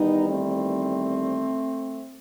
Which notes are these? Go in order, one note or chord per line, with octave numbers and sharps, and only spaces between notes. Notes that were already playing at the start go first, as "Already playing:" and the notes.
Already playing: E2 D#3 G3 B3 D#4
A3 C4